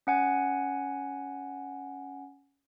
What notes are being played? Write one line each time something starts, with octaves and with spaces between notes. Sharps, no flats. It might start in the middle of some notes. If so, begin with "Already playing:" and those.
C#4 F#5 G#5